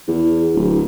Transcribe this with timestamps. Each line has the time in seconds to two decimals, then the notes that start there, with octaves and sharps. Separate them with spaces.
0.08 E2
0.55 D1